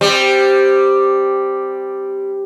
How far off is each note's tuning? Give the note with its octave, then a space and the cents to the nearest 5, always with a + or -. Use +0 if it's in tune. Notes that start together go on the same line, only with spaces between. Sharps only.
G3 +0 C4 +0